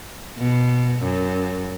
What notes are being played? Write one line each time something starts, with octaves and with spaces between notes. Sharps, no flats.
B2
F#2